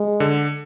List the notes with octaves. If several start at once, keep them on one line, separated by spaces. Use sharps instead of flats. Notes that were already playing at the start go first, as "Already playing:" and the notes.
Already playing: G#3
D3